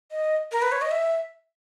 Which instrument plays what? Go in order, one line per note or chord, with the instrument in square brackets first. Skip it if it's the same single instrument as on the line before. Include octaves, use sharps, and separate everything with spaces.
[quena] D#5
A#4
B4
C#5
D#5
E5